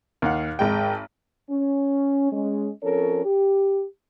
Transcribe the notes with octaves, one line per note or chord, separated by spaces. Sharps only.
D#2 F5 F#5
G#1 G#3 G5
C#4
G#3 C#4
F3 C4 C#4 A4 A#4 C#5
G4